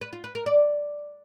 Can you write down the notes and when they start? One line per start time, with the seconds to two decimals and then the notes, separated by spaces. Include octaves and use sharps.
0.01 B4
0.13 F4
0.24 B4
0.35 A#4
0.46 D5